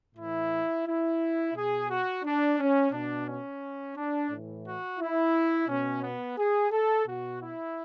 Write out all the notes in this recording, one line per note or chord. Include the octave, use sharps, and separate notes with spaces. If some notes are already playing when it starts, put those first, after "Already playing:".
A2 E3 E4
E4
B2 G#4
F#4
D4
C#4
B2 D4
C#4
D4
A2 E3
F#4
E4
B2 C#4
B3
G#4
A4
B2 F#4
E4